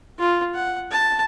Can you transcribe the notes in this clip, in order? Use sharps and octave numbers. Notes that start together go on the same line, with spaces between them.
F4
F#5
A5